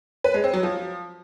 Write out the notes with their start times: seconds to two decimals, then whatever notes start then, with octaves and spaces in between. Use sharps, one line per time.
0.24 B4
0.34 G#3
0.44 C4
0.53 F#3
0.63 F3